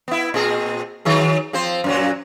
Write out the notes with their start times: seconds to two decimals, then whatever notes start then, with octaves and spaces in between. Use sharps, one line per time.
0.08 B3 E4
0.34 A#2 C4 G#4
1.05 D#3 F#3 G#4
1.53 F3 C4 C5
1.84 F#2 A#2 F#3